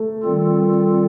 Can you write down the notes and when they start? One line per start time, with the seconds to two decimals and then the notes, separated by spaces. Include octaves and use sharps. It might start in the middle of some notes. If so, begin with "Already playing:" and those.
Already playing: A3
0.23 D#3 G3 C4 F4 A4